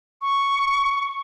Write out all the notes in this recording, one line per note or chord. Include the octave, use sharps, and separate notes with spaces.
C#6